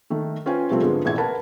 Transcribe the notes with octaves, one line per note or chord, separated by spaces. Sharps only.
D#3 A3
C#4 F4 B4 C5 G5 G#5
C3 F3 G3 A3 C4
G#2 D3 G#3 B3 F4
E1 A1 E4 G#6
A#4 B4 F#5 A5 B5